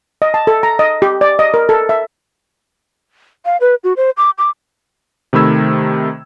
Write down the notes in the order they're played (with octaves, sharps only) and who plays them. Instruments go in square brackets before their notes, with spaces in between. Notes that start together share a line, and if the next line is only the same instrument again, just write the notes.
[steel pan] D#5
A5
A4
A#5
D#5
G4
D5
D#5
A#4
A4
E5
[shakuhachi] F5
B4
F#4
C5
D6
D6
[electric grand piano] C3 D#3 A3 B5 E6 G#6